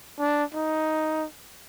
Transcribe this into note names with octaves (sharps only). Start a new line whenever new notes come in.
D4
D#4